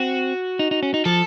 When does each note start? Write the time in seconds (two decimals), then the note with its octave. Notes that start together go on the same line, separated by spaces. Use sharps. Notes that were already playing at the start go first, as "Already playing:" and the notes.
Already playing: C4 F#4
0.59 D#4
0.71 D#4
0.83 C#4
0.94 D#4
1.05 F3 A4